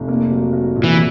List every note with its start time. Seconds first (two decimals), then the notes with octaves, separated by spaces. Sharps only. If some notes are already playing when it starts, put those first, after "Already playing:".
Already playing: F1
0.08 A#3
0.31 F#3
0.53 F#3
0.76 A#2
0.84 E3